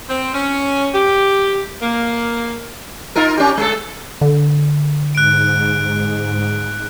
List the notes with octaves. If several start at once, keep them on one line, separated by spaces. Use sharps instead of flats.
C4
C#4
G4
A#3
D#4 F4 A#4
C#4 G4
G#3 A4
D3
G#2 F#6 D7